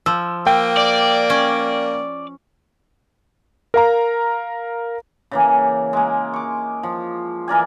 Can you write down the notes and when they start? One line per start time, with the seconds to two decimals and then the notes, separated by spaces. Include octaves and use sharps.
0.06 F3 E6
0.47 A#3 G5
0.77 D5
1.30 C#4
3.74 A#4 F5 A#5
5.31 C#3 E3 A#3
5.93 G#3 A#3
6.34 C#6 D6
6.83 F3
7.48 E3 A#4 D5 G#5